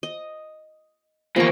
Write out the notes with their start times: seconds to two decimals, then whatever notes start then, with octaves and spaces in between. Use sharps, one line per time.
0.03 D#5
1.36 E2 F3 A#3 C#6